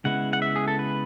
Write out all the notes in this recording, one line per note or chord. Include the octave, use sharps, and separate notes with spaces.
C#3 G#3 B3 E4 F#5
F#5
E5
G#4
A4
B4